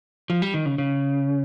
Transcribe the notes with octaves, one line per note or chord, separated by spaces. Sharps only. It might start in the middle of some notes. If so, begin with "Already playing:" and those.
F3
G3
D#3
C#3
C#3